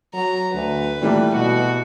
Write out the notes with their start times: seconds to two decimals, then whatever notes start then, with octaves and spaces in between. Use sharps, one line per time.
0.14 F#3 A#5
0.54 D2 B4
1.01 A#2 E3 G3 A3
1.35 B2 F#4